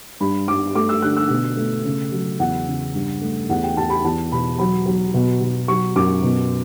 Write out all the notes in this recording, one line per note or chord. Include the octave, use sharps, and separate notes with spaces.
G2 B5
G2 D6
A3 D6
E6
D3 F#6
E6
B2
A3
C#3
F#3
E2 F#5
C#3
G2
A3
E2 F#5
G5
E2 A5
B5
E2 A5
B2 B5
F#3 B5
F#3
B2
B2
F#3 C#6
F#2 D6
B2